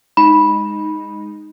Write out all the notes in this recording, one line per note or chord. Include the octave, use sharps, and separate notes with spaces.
G#3 D#4 B5